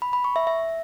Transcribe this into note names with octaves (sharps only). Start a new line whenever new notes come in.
B5
B5
C#6
E5
E5